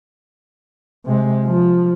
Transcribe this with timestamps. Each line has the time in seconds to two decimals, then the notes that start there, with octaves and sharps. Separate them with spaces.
1.06 C3 G#3
1.45 F3